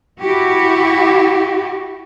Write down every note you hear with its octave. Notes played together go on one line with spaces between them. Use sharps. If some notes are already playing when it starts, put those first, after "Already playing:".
E4 F#4 G4